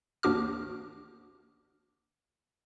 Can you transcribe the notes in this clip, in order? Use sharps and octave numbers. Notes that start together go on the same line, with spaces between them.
A1 D#2 D4 F#4 D6 F6